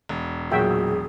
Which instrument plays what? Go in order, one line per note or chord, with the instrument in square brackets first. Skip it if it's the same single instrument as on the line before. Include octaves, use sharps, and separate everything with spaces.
[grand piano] E1
[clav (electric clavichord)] A#2 F#3 [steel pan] F#4 E5 G5 [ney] G#4